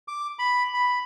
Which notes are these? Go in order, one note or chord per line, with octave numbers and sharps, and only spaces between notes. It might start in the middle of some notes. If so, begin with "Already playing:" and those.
D6
B5
B5